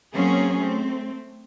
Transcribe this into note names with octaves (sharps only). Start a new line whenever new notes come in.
F#3 A#3 C4 C#4 G#4
A3 C4